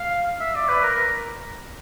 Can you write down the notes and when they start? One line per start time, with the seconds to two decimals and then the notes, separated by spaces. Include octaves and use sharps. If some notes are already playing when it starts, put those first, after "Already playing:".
Already playing: F5
0.40 E5
0.55 D5
0.69 B4
0.83 A#4